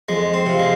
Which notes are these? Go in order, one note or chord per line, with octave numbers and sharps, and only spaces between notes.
F2 G#3
C4
C3 F3
G#3